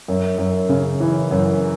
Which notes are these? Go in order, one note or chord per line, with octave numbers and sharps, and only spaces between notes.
F#2
F#2
C#3
E3
F#2